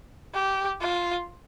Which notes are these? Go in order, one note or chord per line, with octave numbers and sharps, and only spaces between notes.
G4
F4